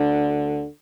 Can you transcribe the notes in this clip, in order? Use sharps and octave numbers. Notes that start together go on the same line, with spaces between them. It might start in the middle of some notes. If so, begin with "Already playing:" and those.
Already playing: D2 D3